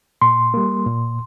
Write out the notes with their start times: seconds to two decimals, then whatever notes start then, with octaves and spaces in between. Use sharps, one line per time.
0.22 A#2 C6
0.54 G3 A#3
0.86 A#2